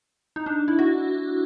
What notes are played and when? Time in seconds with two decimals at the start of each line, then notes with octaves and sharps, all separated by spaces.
0.36 D#4
0.46 D4
0.68 E4
0.79 F#4